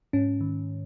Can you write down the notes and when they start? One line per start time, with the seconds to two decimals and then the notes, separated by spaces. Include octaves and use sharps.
0.13 G#2 C#4
0.41 D#3